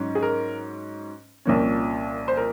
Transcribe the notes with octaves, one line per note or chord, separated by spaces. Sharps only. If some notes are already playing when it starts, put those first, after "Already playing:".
Already playing: G#2 F#3 C#4
G#4
A#4
C2 A#2 F3 A#3 C#4
C5
A#4